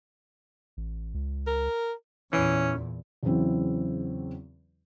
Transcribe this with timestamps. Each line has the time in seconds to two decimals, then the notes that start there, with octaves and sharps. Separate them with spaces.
0.77 A1
1.14 C#2
1.47 A#4
2.33 E2 A#2 E3 C#4
3.23 E2 C#3 F#3 C4 E4